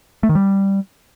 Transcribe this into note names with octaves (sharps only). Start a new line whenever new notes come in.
A3
D#3
G3